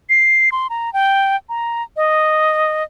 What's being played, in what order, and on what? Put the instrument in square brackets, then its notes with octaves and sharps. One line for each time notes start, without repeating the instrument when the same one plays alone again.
[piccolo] C7
C6
A#5
G5
A#5
D#5